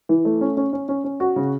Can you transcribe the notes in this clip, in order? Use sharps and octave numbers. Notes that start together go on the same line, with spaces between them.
E3
A3
C#4
C#4
C#4
C#4
C#4
F#4
C#3